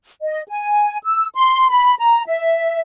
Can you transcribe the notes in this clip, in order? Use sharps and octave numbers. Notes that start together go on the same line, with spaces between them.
D#5
G#5
E6
C6
B5
A#5
E5